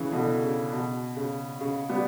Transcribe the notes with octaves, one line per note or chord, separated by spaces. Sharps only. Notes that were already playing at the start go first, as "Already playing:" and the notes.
Already playing: C#3 E3
B2 D3
C#3
B2
C#3
C#3
G3 B3